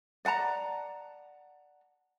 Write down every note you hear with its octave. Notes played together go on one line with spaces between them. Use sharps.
D5 F#5 A5 A#5